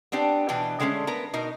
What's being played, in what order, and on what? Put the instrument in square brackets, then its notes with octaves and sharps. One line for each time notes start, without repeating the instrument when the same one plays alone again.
[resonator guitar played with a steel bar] B3 C4 D4 G4
B2 E3 D4 B4 G5
D3 G#3 A3 C4 C#4
B3 A#4 B4
B2 D#4 A#4